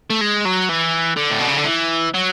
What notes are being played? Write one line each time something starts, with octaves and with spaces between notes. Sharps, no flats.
A3
G#3
F#3
E3
D3
A2
B2
C#3
D3
E3
F#3